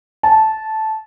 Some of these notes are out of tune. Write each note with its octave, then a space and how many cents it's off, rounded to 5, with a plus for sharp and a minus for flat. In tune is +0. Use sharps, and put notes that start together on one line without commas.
A5 -10